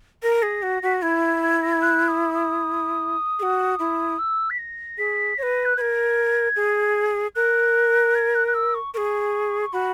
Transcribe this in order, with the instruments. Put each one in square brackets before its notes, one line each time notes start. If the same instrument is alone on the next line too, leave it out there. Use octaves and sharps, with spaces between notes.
[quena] A#4 [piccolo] A#6
[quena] G#4
F#4
[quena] F#4 [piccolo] B6
[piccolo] A#6
[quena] E4 [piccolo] G#6
[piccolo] G#6
A#6
G#6
F#6
D#6
D#6
[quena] G#4
F#4
E4
[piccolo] E6
B6
A#6
[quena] G#4 [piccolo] B6
[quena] C#5 [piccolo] A#6
[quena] B4
[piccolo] F#6
[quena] A#4 B4 [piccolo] G#6
[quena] G#4
[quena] A#4 [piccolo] F#6
[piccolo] G#6
F#6
F#6
E6
C#6
[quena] G#4 A#4 [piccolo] C#6
[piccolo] C#6
[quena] F#4 [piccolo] B5